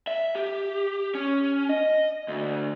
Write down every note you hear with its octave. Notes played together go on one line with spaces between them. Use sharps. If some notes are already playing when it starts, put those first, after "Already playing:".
E5
G4
C#4
D#5
D2